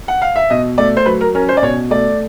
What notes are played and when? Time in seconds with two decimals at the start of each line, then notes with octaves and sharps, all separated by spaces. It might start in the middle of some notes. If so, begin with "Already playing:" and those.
0.08 F#5
0.22 F5
0.36 E5
0.50 B2 D#5
0.78 A3 D5
0.97 C5
1.06 F#3 B4
1.21 A#4
1.35 C#4 A#4
1.49 C5
1.57 D5
1.62 B2 C#5
1.90 A3 D5